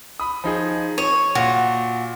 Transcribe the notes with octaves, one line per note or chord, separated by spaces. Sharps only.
B5 D#6
F3 D#4 G#4
C#5 D#7
A#2 F#4